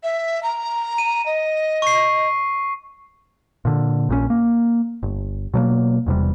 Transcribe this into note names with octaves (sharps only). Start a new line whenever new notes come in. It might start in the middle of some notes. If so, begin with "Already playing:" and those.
E5
A#5
D#7
D#5
C#6 C7
A#2 D3
A#1 A#2 C#3 C#4
A#3
G1
B2 F#3 G3 A#3
E1 E2 C3 G3